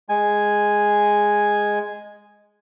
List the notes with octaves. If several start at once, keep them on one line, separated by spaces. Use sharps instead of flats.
G#3 G#5